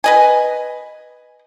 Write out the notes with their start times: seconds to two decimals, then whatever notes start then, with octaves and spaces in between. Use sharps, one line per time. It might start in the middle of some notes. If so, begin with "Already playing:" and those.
0.04 B4 D#5 G#5